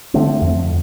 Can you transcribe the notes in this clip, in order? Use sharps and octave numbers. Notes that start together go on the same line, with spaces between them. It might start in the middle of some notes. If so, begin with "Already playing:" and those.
D3 A3 C4
F2